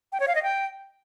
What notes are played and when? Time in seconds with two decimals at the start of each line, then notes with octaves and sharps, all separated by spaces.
0.12 G5
0.20 C#5
0.28 F5
0.35 D#5
0.43 G5